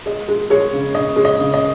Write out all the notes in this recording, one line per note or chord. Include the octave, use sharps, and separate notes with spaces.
G#3 D#5
G#3
G#3 C#5
C#3
C#3 D#5
G#3
D#5
C#3
D#5